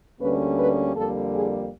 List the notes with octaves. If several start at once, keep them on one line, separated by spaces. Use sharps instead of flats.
D2 D3 G3 A#3 C#4 B4
B4
F2 D3 G3 A#3 A4
G#4